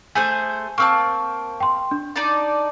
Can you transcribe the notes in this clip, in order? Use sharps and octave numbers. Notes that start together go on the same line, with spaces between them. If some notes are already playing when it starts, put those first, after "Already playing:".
A3 G#4 C5 G#5
A#3 C4 A5 C#6
G5 C6
D4
D#4 D5 A5